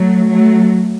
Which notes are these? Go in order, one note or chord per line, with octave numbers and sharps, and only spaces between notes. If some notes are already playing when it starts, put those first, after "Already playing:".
Already playing: F#3 A3
F#3 A3